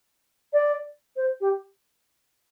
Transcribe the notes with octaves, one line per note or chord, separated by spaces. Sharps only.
D5
C5
G4